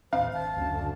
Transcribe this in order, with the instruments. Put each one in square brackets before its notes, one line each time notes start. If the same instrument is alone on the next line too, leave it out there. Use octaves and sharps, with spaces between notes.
[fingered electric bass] D#2 A2 C4 [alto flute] C5 [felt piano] F5
[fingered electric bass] G#1 [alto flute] A5
[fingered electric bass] F#1 B2 C#4 [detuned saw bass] D2